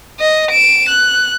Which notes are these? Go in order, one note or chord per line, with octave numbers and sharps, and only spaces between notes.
D#5
D7 E7
F#6